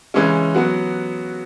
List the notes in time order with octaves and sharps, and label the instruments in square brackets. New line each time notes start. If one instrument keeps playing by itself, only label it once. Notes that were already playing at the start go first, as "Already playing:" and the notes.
[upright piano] C#3 E3 G#3 C#4
F#3 B3 F#4